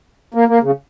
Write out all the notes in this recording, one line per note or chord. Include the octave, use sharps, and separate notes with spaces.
A#3
A#3
C#3